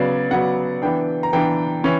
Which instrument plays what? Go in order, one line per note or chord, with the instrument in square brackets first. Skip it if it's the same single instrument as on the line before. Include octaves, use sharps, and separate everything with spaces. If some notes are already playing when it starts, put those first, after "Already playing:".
Already playing: [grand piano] C#3 F#3 B3 D5
C#3 F#3 B3 F#5
E3 B3 D4 G5
A#5
E3 B3 D4 G5
E3 C#4